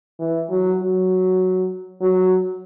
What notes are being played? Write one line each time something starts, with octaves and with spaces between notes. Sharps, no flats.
E3
F#3
F#3
F#3